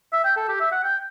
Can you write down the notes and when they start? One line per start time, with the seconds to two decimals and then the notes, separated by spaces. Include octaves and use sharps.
0.13 E5
0.25 G5
0.37 A4
0.49 G4
0.60 E5
0.72 F#5
0.84 G5